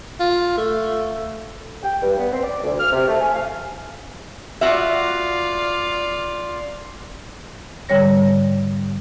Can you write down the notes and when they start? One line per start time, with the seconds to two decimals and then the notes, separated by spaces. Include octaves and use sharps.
0.20 F4
0.57 A3
1.83 G5
2.02 G2
2.18 B3
2.33 C4
2.44 D5
2.64 D2
2.80 F6
2.93 C3
3.08 A3
3.20 G#5
3.35 F5
4.61 F4 F#4 D5 E5
7.89 G#2 D3 G3 C#5 A#6